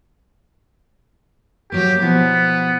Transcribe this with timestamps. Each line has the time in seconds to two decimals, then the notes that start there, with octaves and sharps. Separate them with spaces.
1.72 F#3 A#3 G4
2.02 B2 F3 B3 E4